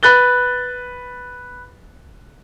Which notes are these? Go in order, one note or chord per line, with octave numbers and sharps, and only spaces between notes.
B4 F#6 A6 G7